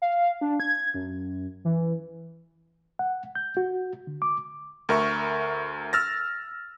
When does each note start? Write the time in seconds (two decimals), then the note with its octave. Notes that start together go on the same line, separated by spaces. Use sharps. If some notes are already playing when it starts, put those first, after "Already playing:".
0.02 F5
0.41 D4
0.60 G#6
0.94 F#2
1.65 E3
2.99 F#5
3.35 G6
3.57 F#4
4.07 D3
4.22 D6
4.89 D2 A#4 E5 C#6
5.93 E6 F6 A6 A#6